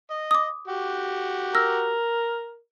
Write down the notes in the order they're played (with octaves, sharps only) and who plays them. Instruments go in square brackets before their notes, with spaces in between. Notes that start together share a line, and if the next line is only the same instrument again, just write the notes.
[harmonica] D#5
[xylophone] D6 D#6
[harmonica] F#4 G4
[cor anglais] A#4 [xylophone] E6 F6 A#6